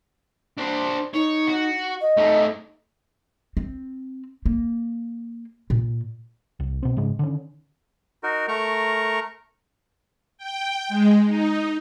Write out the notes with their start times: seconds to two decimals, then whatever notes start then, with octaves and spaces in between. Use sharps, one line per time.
0.58 D4 C5
1.14 D#4 C#5
1.48 F#4
2.01 D#5
2.17 A3 D#4
3.57 C4
4.46 A#3
5.70 A#2
6.60 C2
6.83 B2 C4
6.97 G#2 C#3 G#3
7.19 D3 D#3 C#4
8.23 D#4 F#4 A#4
8.48 A3 A#4 A#5 C#6
10.38 G5
10.89 G#3
11.26 D#4